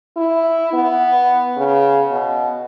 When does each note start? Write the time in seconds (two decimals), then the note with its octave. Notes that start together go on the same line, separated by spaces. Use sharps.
0.17 E4
0.73 B3
1.57 C#3
2.11 B2